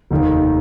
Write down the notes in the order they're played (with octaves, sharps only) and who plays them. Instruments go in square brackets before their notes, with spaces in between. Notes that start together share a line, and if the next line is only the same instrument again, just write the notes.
[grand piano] F1 D#2 D#3